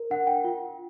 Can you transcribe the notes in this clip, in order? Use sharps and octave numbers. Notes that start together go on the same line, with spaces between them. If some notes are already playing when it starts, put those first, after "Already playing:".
Already playing: A#4
D4 F#5
G5
F4